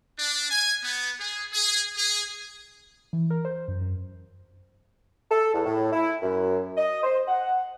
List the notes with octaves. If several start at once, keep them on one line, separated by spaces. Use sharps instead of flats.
D4
G#5
B3
G#4
G#4
G#4
E3
A#4
C5
F#2
F#2
A4
E2
A2
E4
F#2
D#5
C5
F#5